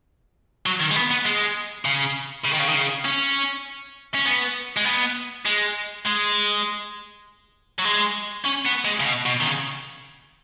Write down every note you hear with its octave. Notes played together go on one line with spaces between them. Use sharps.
F#3
D#3
G#3
B3
B3
G#3
C#3
C#3
D#3
C#3
D#3
C#3
C#4
C#4
B3
G#3
B3
G#3
G#3
F#3
G#3
C#4
B3
G#3
C#3
B2
B2
D#3
C#3